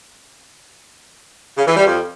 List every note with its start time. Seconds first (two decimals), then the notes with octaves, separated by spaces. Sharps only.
1.58 C#3
1.67 E3
1.76 G3
1.86 F2